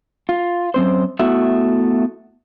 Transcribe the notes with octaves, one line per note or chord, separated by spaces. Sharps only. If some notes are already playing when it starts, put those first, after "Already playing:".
F4
F#2 C4 C5
A3 B3 E4 F#4 E5